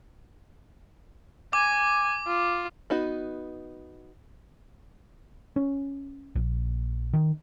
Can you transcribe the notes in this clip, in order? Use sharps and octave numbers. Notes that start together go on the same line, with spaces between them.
G#5 D6
F4
B3 D#4 F#4
C#4
A#1
D#3